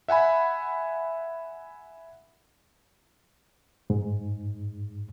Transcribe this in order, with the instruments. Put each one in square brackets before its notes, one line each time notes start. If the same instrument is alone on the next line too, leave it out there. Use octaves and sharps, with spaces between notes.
[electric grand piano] E5 F#5 G#5 B5
[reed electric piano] G#2